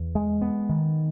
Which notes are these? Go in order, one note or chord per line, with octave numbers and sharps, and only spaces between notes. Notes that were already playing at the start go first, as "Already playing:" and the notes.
Already playing: E2
G#3
B3
D#3